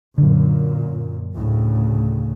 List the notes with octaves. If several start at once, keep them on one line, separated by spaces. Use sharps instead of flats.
F#2 A#2 D3 F#3
D2 A2 C#3